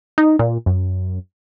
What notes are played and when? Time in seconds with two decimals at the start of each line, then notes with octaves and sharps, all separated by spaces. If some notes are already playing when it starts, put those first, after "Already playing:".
0.18 D#4
0.39 A#2
0.66 F#2